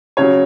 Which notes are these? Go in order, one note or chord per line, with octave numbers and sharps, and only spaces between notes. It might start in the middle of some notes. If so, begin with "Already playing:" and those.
C#3 F#3 C#5